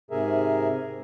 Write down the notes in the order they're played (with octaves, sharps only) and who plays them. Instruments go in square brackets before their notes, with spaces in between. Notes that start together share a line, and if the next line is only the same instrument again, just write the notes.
[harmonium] G#2 C3 G#4 A#4 E5